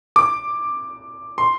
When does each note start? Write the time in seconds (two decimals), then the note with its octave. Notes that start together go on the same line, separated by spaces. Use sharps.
0.16 D6
1.38 C6